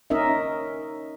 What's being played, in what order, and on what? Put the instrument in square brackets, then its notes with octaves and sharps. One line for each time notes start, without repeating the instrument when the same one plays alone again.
[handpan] C#4 D#4 A#4 D#5 E5